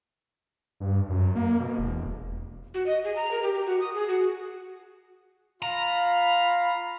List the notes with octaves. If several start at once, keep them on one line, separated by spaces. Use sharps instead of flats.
G2
F#2
A#3
B2
E1
F#4
D#5
G#4
A#5
A#4
G4
G4
F#4
D#6
G#4
F#4
F4 F5 A#5 B5